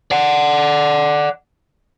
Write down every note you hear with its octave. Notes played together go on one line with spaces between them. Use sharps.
D5 F#5